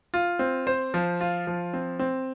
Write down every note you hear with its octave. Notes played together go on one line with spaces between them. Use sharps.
F4
C4
C5
F3
F4
F3
C4
C4